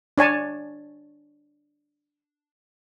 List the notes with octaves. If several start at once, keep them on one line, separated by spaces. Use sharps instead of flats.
D4 C#5 G#5 A5